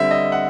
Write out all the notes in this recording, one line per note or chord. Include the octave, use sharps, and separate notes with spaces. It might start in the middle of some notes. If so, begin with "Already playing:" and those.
Already playing: D3 G3 C4 E5
D#5
F#5